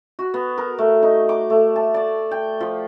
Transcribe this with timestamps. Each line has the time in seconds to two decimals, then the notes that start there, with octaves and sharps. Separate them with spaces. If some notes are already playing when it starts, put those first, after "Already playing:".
0.19 F#4
0.34 B3
0.58 A#4
0.78 A3
1.03 D#4
1.29 D6
1.50 A3
1.76 A5
1.94 D5
2.31 G5
2.60 F3